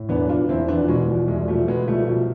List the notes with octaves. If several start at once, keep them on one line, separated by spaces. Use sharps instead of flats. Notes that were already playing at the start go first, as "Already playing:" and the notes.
Already playing: A2
E1 B3 D4
E1 D4 F4
E1 C4 E4
E2 B3 D4
F3
B2 G#3
E1 F3
C2 G#3
B2 F3 A3
B2 G#3 B3
C2 F3 A3
B2 F3